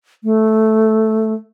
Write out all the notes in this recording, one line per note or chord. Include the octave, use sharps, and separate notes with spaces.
A3